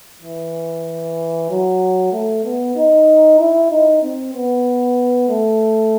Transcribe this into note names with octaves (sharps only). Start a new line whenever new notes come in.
E3
F#3
A3
B3
D#4
E4
D#4
C4
B3
A3